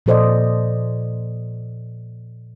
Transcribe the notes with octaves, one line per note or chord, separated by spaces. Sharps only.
A#2 F3 A4 C5 D5 D#5